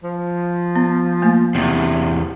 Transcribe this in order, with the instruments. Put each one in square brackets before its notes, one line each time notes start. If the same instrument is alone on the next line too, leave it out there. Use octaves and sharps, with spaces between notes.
[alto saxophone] F3
[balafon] B3
A3 A#3
[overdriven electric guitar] E2 C3